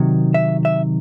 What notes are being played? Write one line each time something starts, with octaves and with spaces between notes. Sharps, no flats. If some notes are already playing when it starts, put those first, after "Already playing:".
Already playing: C3 D#3 F#3
E5
E5